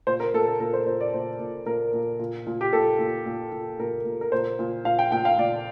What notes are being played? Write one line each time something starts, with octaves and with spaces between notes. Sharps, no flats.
A#2 C5
A#4
A#2 A4
A4
A#2 A#4
C5
A#2 C5
D5
A#2 C5
A#2
A#2 A#4
A#2
A#2
A#2
G4
A#2 A4
A#2
A#2
A#2
A#2 A#4
A#2
A#4
A#2 C5
A#2
A#2 F5
G5
A#2 G5
F5
A#2 D5